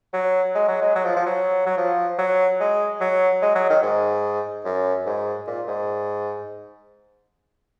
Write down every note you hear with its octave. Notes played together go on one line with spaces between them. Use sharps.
F#3
G#3
F#3
G#3
F#3
F3
F3
F#3
F#3
F3
F#3
G#3
F#3
G#3
F#3
D#3
G#2
F#2
G#2
A#2
G#2